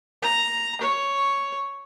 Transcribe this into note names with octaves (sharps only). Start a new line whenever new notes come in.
A#5
C#5